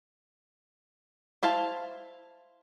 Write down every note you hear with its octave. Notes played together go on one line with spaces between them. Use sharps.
E4 C5 F5 A5